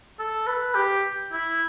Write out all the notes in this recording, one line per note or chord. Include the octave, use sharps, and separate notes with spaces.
A4
B4
G4
E4